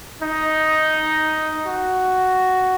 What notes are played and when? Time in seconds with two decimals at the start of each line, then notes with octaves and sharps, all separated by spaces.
0.22 D#4
1.66 F#4